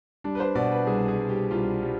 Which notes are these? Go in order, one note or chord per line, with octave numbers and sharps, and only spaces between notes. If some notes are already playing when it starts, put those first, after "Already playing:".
G3 D4
B4
C5
B2 D5
B4
C2 G#4
G#4
C2
G4
C2 F4
G3